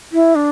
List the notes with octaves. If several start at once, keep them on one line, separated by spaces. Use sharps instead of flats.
E4
D4